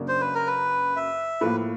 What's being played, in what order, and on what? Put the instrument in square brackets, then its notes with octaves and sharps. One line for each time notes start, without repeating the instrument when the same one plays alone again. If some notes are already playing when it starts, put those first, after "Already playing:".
Already playing: [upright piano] F#2 C#3 F#3 A#3 D4
[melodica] C5
B4
A#4
B4
E5
[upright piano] A2 F3 A#3 [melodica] B4